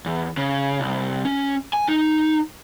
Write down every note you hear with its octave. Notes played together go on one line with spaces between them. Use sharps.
E2
C#3
C2
C#4
G#5
D#4